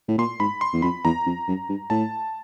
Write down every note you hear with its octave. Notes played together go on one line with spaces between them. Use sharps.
A2
A#2 C6
G#2 B5
C6
E2
F2 B5
E2 A#5
F2
F#2
G2
A2 A5